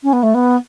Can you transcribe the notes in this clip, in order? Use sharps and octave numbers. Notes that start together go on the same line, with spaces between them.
C#4
B3
A3
B3